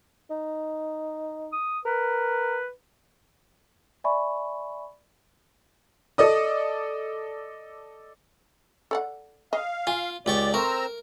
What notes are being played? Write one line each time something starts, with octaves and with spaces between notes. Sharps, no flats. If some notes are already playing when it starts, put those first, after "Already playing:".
D#4
D#6
A#4 B4
D5 E5 G#5 B5 C#6
A4 D5 D#5 D#6
A4 D5 F#5
D#5 F5
F4 G#5
C#2 G4 D5 C#6
A3 C4 A#4 A#5 E6